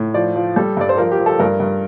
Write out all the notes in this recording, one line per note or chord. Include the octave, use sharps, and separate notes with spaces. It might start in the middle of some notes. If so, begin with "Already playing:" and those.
Already playing: A2
F3 D5
F3
G3 A4
G2 D5
C5
F3 A#4
G4
F3
A4
G2 A#4
G2